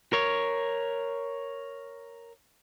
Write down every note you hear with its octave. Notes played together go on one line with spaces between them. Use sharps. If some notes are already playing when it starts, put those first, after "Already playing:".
A#4 C#5